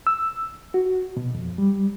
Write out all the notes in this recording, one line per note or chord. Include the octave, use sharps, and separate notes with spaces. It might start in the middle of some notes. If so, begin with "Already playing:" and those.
E6
F#4
B2
F2
G3